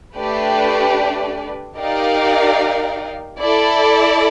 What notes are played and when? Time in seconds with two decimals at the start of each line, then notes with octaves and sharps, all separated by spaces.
0.15 A3 D4 G4 B4 D5
1.78 D#4 G4 A#4 D5 F5
3.39 E4 A4 D5